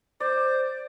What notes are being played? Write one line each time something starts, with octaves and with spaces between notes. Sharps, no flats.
C5 D5